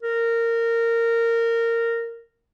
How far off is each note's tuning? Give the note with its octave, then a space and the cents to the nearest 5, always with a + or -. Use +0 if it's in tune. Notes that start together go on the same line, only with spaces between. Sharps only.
A#4 -15